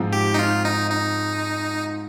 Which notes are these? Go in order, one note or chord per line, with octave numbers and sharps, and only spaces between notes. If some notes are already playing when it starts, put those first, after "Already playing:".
Already playing: G#2 F3 C4
G4
D#4
F4
D#4
D#4